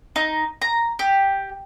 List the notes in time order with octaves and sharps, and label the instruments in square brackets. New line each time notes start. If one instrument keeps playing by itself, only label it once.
[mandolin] D#4
A#5
G4